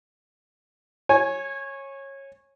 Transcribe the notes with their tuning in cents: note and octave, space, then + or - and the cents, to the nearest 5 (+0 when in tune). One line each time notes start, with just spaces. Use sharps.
C#5 -20 G#5 +0